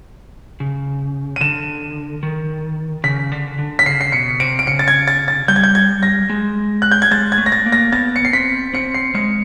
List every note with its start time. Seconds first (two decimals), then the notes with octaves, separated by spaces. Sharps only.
0.60 C#3
1.36 D#7
1.41 D3 E7
2.23 D#3
3.04 C#3 B6
3.32 D3
3.59 D3
3.79 B6
3.86 C#3 C7
4.01 C7
4.12 B2 C#7
4.40 C3 D7
4.59 D7
4.67 C#3 C#7
4.79 A6
4.88 G#6
5.08 A6
5.28 A6
5.48 G3 G6
5.56 G#6
5.63 G6
5.75 G#6
6.03 A#6
6.30 G#3
6.82 F#6
6.92 G6
7.02 G#6
7.11 G#3 A6
7.32 G#6
7.38 A3
7.46 A#6
7.52 A6
7.66 A#3
7.72 A#6
7.92 B3 A6
8.16 C#7
8.25 C7
8.33 C4 B6
8.73 C4 C#7
8.94 C7
9.15 G#3 C#7